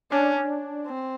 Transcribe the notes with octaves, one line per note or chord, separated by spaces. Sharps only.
C#4 D4
C4